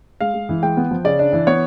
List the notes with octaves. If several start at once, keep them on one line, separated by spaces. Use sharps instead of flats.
G#3 F5
G#3
E3
G#3 G5
B3
F3
C#3 D5
D4
E3
B3 C#5